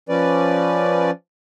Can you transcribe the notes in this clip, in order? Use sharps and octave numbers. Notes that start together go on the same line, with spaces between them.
F3 C#4 B4 D5